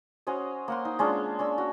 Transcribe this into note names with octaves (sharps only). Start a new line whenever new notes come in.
C#4 F#4 C5 D#5
A#3 F#5 C6
D#4
G#3 C#4 D4 F4
C#4 D4 E6
F#4